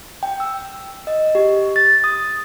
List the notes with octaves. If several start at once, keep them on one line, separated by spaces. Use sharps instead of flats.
G5
E6
D#5
G4
A6
D#6